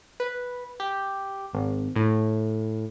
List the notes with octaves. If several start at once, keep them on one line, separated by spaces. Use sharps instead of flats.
B4
G4
G#1
A2